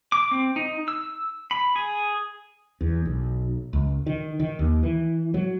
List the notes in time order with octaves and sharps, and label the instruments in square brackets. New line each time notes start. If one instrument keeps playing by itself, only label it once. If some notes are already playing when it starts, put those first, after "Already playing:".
[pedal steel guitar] D6
C4
D#4
E6
B5
G#4
[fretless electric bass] E2
B1
C#2
D#3
D#3
D#2
E3
F#3